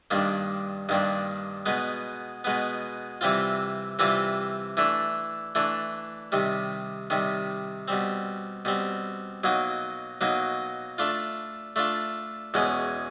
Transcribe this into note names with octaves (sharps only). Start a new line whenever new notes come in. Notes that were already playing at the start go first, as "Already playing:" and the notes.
G2 D#3 G3 A#3 D4
G2 D#3 G3 A#3 D4
B2 G#3 B3
B2 G#3 B3
C3 E3 G3 C4 F4
C3 E3 G3 C4 F4
E3 A3 D4
E3 A3 D4
C3 D#3 G3
C3 D#3 G3
B2 G3 C4
B2 G3 C4
B2 F#3 A#3 D#4
B2 F#3 A#3 D#4
A3 D4 F4
A3 D4 F4
E2 B2 G#3 C#4